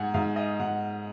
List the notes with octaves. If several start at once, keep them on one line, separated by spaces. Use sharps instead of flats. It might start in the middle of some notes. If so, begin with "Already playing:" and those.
Already playing: G#2 F#5 G#5
G#2 F5
D#5
G#2 F#5